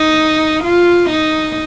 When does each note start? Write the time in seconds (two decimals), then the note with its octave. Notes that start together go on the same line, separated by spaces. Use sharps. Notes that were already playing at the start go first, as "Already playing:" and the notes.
Already playing: D#4
0.63 F4
1.09 D#4